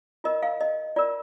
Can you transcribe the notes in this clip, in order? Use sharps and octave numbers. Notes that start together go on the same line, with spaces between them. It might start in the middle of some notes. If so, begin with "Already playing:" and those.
F4 A#4 D#5
F5
D#5
F4 A#4 D5